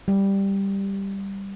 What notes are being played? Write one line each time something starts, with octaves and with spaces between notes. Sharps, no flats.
G3